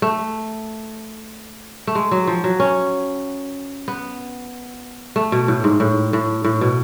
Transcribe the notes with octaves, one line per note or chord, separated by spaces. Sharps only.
A3
A3
G#3
F#3
F3
F#3
C#4
B3
A3
B2
A2
G#2
A2
A2
A2
B2